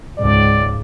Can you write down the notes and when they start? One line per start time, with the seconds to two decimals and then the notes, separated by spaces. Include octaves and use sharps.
0.17 C#2 G#2 D5